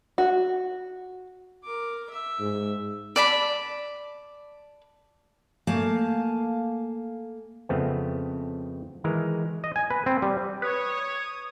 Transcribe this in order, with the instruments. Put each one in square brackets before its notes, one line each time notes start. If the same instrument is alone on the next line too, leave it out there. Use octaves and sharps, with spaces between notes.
[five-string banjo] F#4
[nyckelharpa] A#4 D6
E5
[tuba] G#2
[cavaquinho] D5 A5 B5
[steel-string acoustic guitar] A3 A#3 A#4 F5 G#5 A5
[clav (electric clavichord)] F2 C#3 A3 B3 C4
D#3 E3 G#3 A#4
D#5
G#5
B4
C4
G3
[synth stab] B4 [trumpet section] C#5 [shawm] D#6